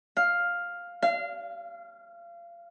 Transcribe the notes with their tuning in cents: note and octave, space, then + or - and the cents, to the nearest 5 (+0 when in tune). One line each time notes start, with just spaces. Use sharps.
F5 +5
F5 -30